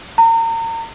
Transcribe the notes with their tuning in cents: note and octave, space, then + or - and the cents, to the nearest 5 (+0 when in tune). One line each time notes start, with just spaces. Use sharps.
A#5 -35